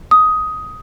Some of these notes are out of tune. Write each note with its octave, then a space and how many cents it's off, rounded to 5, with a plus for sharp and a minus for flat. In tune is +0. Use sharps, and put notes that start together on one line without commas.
D#6 +10